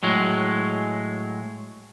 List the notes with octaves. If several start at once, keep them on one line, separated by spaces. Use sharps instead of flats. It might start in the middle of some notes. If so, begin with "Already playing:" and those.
A2 F#3 G#3